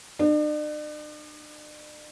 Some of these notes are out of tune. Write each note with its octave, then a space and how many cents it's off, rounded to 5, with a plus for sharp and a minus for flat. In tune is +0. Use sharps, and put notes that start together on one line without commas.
D4 +45